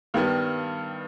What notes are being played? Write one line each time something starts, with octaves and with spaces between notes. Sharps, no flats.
G2 D#3 G3 B3